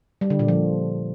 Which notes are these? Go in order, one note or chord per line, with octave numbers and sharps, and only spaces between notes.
G3
D3
A#2
F3